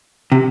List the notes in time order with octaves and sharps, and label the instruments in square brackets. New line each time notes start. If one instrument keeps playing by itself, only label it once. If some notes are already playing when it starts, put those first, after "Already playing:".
[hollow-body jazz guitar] C3